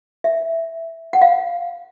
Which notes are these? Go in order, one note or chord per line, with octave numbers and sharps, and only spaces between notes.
E5
F#5
F5